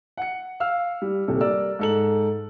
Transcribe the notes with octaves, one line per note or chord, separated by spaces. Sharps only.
F#5 C#7
F5 E6 F6
G3
D#1 C3 A4
G3 A#4 D5 E6
G#2 A4 F#7